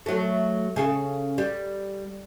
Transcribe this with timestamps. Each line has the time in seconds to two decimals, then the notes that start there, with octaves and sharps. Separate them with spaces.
0.06 F#3 A3
0.76 C#3 G#4 A4
1.38 G3